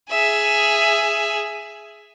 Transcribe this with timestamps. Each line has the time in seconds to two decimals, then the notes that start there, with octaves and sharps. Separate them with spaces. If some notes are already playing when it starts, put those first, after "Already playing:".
0.10 G#4 E5